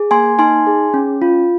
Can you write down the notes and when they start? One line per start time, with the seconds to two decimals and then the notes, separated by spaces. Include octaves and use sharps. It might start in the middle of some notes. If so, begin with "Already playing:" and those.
Already playing: G#4
0.11 A#3 G#5 C6
0.39 D#4 G#5 C6
0.67 G#4
0.94 C#4
1.22 F4